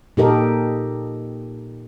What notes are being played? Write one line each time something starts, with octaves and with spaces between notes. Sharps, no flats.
A#2 D#4 G4 A4 A#4 D#5